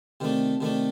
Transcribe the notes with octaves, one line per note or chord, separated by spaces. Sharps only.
C3 D#3 A3 D4
C3 D#3 A3 D4